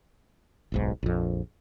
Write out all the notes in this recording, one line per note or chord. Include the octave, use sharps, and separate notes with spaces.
D1 B1 G#2
A#1 F2